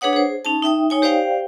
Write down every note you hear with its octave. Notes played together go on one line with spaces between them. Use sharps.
D4 G#4 B4 C#5 F#5 D#6
G#4 C5
C#4 D#4 A5
D#4 E5 G5 D#6
D#4 C#5 G#5
G4 C5 D5 F5 G5